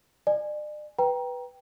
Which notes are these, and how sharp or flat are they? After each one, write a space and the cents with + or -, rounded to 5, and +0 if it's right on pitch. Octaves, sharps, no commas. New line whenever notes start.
D5 +40 G#5 +0
B4 -5 G5 +0 A#5 +20